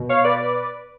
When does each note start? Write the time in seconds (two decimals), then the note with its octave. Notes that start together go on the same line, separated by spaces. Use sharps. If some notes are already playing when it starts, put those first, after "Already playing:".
Already playing: B2
0.09 C#5 F5
0.24 B4 D5